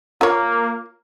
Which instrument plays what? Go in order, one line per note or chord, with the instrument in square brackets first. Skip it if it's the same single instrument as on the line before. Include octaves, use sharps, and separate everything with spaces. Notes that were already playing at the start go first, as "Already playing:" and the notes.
[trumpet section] A#3 [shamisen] F4 A#4 C#5